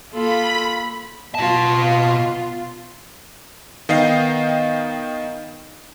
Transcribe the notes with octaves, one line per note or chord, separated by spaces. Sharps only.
A#3 F4 A4 B5
B2 B3 F4 A5
D#3 B3 D#5 F5 G5 C7